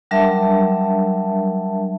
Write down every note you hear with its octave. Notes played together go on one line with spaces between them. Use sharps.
F#3 G3 D4 A#4 E5 A5